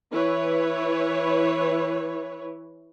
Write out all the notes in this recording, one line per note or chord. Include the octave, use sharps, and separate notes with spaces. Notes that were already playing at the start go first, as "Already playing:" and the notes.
E3 E4 B4 C#5